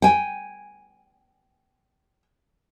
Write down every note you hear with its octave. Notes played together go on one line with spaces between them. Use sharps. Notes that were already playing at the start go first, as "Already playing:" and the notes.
G5 G#5